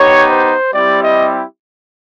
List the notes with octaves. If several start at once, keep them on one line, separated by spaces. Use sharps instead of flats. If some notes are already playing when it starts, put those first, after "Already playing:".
Already playing: B3 D#4 G4 C#5
C5
G3 C4 E4 G4 D5
D#5